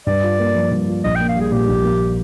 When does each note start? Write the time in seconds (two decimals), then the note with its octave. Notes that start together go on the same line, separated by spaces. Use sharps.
0.07 G2 D5
0.23 F4
0.39 A#3
0.55 F3
0.71 G2
0.88 F4
1.04 A#1 D#5
1.15 G5
1.20 A#3
1.29 F5
1.36 G3 G#4
1.52 A#2 G4
1.68 A#1
1.84 A#3